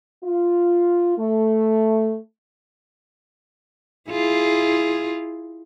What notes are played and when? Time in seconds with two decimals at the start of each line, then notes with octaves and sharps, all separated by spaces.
0.24 F4
1.19 A3
4.10 E4 F4 G#4